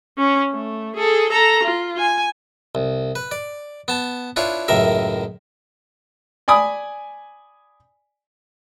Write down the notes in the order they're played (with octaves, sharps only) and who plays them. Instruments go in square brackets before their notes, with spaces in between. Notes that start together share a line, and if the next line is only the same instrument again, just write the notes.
[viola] C#4
A3
G#4 A4
A4 A#5
F4
G#5
[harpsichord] C2
B4
D5
B3 A5
D4 E4 F4 B4 C#5
C#2 F#2 A2 A#4 E5
[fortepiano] D5 G#5 B5 D#6